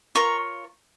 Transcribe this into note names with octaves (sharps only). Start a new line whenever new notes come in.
F4 A#4 C#5 A#5 C#6